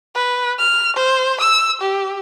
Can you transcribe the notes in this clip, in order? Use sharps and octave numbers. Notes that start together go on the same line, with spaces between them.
B4
F6
C5
E6
G4